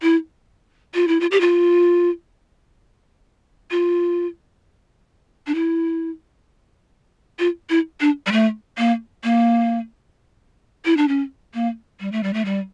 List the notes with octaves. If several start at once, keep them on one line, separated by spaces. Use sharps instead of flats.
E4
F4
E4
F4
G4
F4
F4
D4
E4
F4
E4
D4
G3
A3
A#3
A#3
E4
D4
C#4
A#3
G3
A3
G3
A3
G3